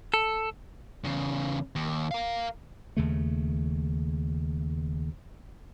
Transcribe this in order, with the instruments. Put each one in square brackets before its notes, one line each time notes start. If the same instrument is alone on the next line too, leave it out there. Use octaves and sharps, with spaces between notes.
[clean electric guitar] A4
[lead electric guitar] E2 C#3
D#2
A#4 F5
[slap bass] D#2 C#3 A3